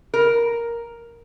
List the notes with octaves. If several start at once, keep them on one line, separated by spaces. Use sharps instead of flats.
A#4